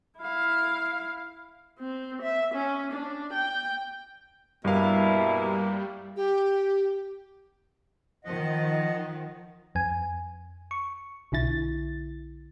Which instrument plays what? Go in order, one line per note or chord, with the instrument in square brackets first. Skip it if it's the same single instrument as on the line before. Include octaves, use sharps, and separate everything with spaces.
[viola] E4 F5
C4
E5
C#4
D4
G5
[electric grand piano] G2 F5 [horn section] B2 E4 [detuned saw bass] G3 [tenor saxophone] A#3
[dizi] G4
[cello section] D#3 F3 [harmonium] D#5 F#5
[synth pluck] F2 G#5
C#6
B1 D3 E4 A6